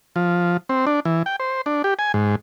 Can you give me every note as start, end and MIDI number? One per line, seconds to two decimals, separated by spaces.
0.16 0.57 53
0.69 0.85 60
0.87 1.00 62
1.05 1.23 52
1.26 1.36 79
1.40 1.61 72
1.66 1.82 62
1.84 1.94 67
1.99 2.12 80
2.14 2.36 44